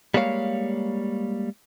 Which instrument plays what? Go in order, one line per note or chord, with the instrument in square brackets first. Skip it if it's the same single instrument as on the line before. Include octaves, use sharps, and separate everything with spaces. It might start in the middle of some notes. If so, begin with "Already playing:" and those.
[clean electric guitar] G3 G#3 A#3 C#5 F5